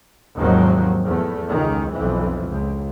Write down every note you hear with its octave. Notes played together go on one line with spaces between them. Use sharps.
G#1 D#2 D#3 F3 F#3
E2 A3
C#2 D#3
B1 F2 E3
C#2